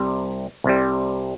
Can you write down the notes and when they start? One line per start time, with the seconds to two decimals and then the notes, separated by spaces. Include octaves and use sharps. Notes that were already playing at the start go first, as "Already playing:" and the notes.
Already playing: C2 C3 G3
0.64 C2 C3 G3